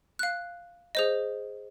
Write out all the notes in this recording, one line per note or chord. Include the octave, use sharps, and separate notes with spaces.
F5 F#6
G#4 C5 D#5